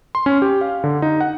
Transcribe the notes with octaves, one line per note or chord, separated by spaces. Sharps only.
C6
C#4
G4
F5
D3
D#4
F#5